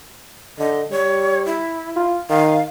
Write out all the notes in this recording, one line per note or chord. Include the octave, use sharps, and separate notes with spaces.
D3 D#5
G3 C#5
E4
F4
D#3 F5